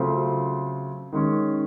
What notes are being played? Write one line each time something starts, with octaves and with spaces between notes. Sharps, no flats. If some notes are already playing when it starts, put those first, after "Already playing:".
Already playing: C#3 F#3 A3 C4 F4
D#3 G#3 C#4